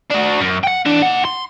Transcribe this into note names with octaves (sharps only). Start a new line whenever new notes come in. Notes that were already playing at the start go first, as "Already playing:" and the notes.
D4 F#4
F#2
F#5 G5
E3 D4
D#4 F#5
C6